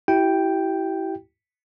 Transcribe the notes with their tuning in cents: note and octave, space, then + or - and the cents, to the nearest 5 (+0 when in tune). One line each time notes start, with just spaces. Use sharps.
E4 -5 G4 -40 G5 +0